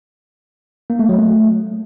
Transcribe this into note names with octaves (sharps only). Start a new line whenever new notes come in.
A#3
A3
F#3
A3